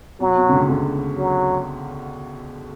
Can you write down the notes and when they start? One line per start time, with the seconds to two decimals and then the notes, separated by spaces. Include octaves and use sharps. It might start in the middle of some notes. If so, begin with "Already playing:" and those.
0.20 B2 F#3
0.37 B2
0.49 D3
0.53 C#2 C#3
0.69 D2 D3
1.17 F#3